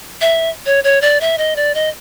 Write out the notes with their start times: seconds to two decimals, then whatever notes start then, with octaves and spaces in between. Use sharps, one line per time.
0.21 E5
0.66 C#5
0.84 C#5
1.01 D5
1.21 E5
1.38 D#5
1.56 D5
1.75 D#5